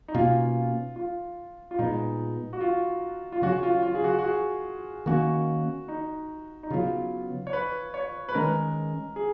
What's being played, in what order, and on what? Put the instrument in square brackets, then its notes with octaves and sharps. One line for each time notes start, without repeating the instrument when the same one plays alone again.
[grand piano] D#4
[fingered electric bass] B2 A#3 C#4 [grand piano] F4
[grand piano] F4
F4
[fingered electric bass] A#2 G#3 B3 [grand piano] D#4
[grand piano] F#4
F4
F4
[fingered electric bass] C#3 F#3 C#4 [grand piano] F#4
[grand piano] F4
F4
G#4
F#4
F#4
G#4
[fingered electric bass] D#3 A#3 C#4 [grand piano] F#4
[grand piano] D#4
D#4
[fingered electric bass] C#3 F#3 B3 [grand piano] F4
[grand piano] C#5
B4
C#5
B4
[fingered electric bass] D#3 G#3 C#4 [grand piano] A#4
[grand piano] G#4